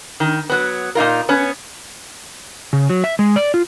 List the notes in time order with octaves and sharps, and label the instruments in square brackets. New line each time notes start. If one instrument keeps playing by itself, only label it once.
[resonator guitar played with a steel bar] D#3
F#3 B3
A#2 D#4 F4 A#4
B3 C#4
[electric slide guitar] C#3
F#3
E5
G#3
D5
F4